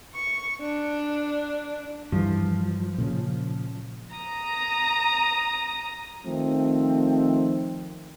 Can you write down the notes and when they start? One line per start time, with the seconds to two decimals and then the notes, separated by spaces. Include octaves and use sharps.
0.15 C#6
0.61 D4
2.12 G2 E3 F3
2.98 A#2 C#3
4.15 A#5 D#6
6.25 D#3 F3 A3 C4